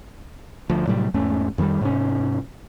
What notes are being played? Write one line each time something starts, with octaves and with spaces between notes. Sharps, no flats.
D2 F3
A2 C3 F#3 G3
E2 G#2 A3 C#4
F2 D#3 F3 G3
G#2 C3 C#4